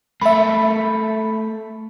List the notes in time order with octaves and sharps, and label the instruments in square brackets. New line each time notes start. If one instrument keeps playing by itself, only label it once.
[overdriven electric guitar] A3 A#3 [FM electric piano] E5 B5